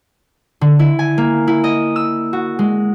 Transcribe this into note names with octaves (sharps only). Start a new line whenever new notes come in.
D3
E4
G#5
A#3
E4
D#5
E6
F#4
G#3